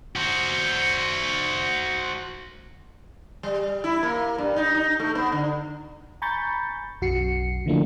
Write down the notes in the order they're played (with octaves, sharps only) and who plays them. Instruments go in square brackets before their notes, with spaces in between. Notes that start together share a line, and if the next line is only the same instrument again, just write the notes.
[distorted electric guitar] F#4 C5
[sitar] G3
E4
A#3
G2
D#4
D#4
A3
B3
D3
[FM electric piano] G#5 A#5 B5 C#6 G6 A6
B1 F#2 F#4 C7 C#7
D3 E3 F3 A3 A#3 D4